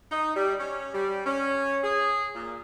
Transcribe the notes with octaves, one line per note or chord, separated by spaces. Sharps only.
D#4
G3
C#4
G3
C#4
G#4
A#2